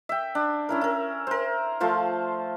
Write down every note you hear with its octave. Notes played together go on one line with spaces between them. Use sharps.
E5 G5
D4
C#4 E4 A#4
E4 A#4
A#4 C5
F3 A3 F4 C5